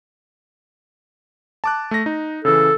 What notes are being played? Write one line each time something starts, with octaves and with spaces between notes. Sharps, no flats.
A5 D6 F#6
A3 A#6
D#4
C#3 E3 A4